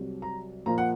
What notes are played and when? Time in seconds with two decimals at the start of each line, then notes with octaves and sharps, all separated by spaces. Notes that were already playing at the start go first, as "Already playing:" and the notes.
Already playing: C2 C3 F#3
0.22 A#5
0.66 A#2 F3 A#3 F4 A#5
0.78 F#5